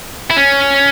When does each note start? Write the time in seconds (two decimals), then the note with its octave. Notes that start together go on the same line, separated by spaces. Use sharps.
0.31 E4
0.37 C#4